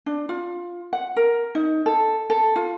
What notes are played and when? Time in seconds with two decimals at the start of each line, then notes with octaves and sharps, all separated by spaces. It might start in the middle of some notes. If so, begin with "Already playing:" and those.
0.06 D4
0.29 F4
0.93 F#5
1.16 A#4
1.55 D#4
1.86 A4
2.30 A4
2.56 F4